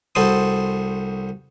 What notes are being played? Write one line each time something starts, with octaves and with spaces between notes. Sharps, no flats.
C2 F#4 A4 C5 C6 D#6